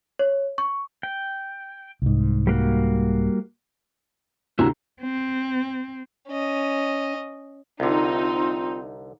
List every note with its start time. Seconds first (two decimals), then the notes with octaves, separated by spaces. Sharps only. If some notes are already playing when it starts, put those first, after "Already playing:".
0.19 C#5
0.58 C#6
1.03 G5
2.02 C2 G#2
2.47 G3 A#3 F#4
4.59 D2 C3 E4 F#4 A#5
5.02 C4
6.30 C#4 D#5
7.80 C2 D3 C4 D#4 F4